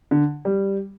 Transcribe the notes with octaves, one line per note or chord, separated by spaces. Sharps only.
D3
G3